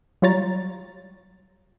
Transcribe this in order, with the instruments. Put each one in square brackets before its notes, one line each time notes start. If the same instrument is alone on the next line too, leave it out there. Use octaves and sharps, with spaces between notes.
[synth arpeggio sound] F#3 G3 F4 C#5 A#5 A6